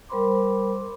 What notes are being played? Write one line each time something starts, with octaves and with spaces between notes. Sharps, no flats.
G3 A#4 C5 B5 C6 D6